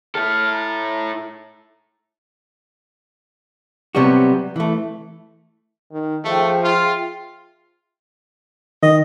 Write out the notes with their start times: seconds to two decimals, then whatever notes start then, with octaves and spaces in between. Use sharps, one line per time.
0.15 E4 A4 F6
0.52 A#5
3.95 C3 F#3 G3 B3 F#4
4.56 E3 A3
5.92 D#3
6.25 F3 A3 G#4 E5 G5
6.64 F4
8.83 D#3 D#5